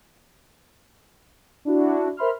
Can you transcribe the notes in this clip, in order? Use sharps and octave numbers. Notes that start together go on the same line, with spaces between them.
D4 E4 F#4
A#4 C5 E5 B5 C6 F6